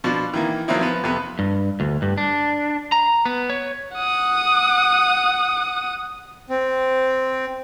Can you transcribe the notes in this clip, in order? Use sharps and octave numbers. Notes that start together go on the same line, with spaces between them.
B2 F3 D4
D#3 E3 A#3
F3 F#3 A#3 C4 D#4 E4
F3 B3
F2 C3 B3
G2
D2
G2
D4
A#5
B3
C#5
F#5 D#6
C4